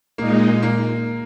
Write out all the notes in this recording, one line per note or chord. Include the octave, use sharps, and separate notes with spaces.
A#2 G#3 A#3 D#4
A#3